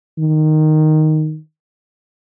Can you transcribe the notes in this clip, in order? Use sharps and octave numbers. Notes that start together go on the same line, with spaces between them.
D#3